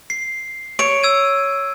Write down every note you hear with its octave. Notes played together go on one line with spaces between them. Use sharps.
C7
C#5 D7
E6 G#6 D#7